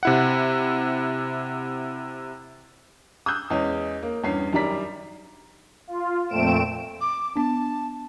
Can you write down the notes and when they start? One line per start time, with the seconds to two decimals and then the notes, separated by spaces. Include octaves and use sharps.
0.03 C3 E4 F#5
3.26 D#6 E6 F#6 G6
3.50 E2 G#3 C#4
4.03 A#3
4.23 E2 G2 C#4 C7
4.53 F#2 D#3 G3 D5 A#5 B6
5.87 F4
6.29 F2 A#2 A3 C4 D7 E7
7.01 D6
7.36 B3 D4 A5